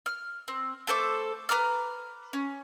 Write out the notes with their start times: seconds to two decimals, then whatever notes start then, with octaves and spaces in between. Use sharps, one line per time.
0.06 F6
0.48 C4
0.87 A3 A4 C5 D6
1.49 B4 A#5 D6 F6
2.33 C#4